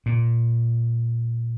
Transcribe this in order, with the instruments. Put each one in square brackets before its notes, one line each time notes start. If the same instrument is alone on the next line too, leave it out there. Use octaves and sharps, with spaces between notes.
[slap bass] A#2